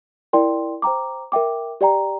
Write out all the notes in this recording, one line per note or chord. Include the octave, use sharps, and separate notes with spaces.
E4 A#4 D5 G5 C6
C5 G5 A#5 D6
A#4 E5 G5 D6
G4 D5 G5 A#5